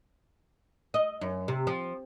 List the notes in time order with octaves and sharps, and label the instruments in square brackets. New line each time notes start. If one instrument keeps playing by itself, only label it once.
[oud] D#5
F#2
C3
F3